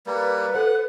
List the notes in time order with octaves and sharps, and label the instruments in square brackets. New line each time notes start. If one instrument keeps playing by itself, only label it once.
[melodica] G3 A#3 [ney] B4
[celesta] A4 C5 [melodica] F#5